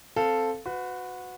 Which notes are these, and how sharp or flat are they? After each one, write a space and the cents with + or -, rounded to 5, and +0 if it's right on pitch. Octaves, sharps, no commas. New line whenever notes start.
C4 +5 A4 +0 F5 +0
F#4 -20 B4 +25